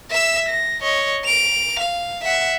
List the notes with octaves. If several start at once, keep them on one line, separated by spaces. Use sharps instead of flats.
E5 E6
A#6
C#5 D#5
D7 F7
F5
E5 F#5